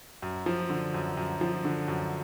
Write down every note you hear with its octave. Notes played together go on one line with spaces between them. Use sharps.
F#2
F3
D3
F#2
F#2
F3
D3
F#2